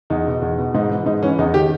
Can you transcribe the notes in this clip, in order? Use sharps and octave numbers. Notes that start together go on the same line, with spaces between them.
E2 D#4
B2
E2
B2
G#2 D#4
E3
G#2 D#4
E3 C#4
E2 D#4
D#3 G4